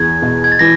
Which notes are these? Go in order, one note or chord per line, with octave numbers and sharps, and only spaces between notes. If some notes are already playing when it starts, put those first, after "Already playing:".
Already playing: E2 G#6
B2
G#6
A6
E3 A#6